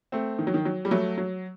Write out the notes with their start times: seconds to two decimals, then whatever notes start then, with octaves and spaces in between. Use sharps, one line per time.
0.12 A3 C4
0.39 D#3
0.47 F#3
0.54 D#3
0.65 F#3
0.85 G3
0.91 F#3 A3
1.18 F#3